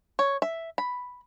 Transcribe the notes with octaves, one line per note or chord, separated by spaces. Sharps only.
C#5
E5
B5